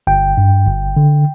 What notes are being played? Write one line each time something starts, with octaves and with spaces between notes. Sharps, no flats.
G1 G5
G2
G1
D3